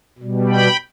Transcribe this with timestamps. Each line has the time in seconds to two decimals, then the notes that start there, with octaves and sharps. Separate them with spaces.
0.19 B2 G3
0.49 G5 B5